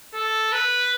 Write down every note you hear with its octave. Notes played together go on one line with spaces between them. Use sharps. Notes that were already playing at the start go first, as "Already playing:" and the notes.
A4
B4